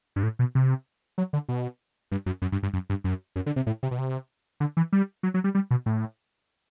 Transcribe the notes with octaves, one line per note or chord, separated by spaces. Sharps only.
G2
A2
B2
C3
F#3
D3
B2
G2
F#2
F#2
G2
G2
F#2
G2
F#2
F#2
D3
C3
A2
C3
B2
C3
D3
E3
G3
F#3
F#3
G3
G3
B2
A2